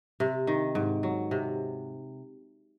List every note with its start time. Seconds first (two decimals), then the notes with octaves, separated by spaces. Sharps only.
0.20 C3
0.47 D#3
0.75 G#2
1.03 F#3
1.31 C3